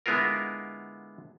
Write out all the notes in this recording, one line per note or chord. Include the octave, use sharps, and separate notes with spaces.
D3 G#3 B3 E4 F4 A#4